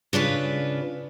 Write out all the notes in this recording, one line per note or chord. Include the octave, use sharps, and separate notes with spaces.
C#3 D4 F4 B4